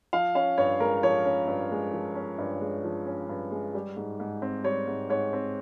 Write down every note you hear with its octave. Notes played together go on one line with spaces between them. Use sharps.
F3 F5
C#4 F5
G2 C#5
G#3 A#4
F3 C#5
C#4
G2
G#3
F3
C#4
G2
G#3
F3
C#4
G2
G#3
G3
G#2
G#2
C4
G3 C#5
G#2
G#2 C#5
C4